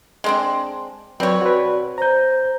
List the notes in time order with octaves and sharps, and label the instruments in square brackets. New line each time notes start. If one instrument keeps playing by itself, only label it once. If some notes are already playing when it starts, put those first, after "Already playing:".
[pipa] G#3 C4 D4
[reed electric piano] F#3 B4 [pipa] C4 C#5 [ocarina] D5
[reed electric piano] F#4 B4
[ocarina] C5 [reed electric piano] A#5 G6